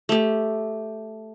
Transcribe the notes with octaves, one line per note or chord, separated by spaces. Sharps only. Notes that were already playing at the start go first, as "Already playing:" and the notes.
A3 G4